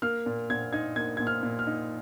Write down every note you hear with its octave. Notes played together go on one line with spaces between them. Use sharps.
A#3 F6
A#2
A#2 G#6
D#4 G#6
A#3 G#6
A#2 G#6
F6
A#2
F6
D#4